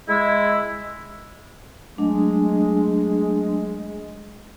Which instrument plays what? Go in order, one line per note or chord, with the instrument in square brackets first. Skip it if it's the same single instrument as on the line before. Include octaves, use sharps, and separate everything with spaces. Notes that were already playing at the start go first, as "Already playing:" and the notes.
[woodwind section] G#3 E4
[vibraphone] F#3 A3 D4 [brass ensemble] G#3